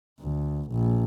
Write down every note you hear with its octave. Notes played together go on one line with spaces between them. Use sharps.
D2
A#1